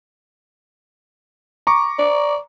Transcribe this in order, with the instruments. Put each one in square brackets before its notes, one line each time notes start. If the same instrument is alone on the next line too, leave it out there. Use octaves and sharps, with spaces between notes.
[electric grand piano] A#5 C#6 D6
[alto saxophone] D5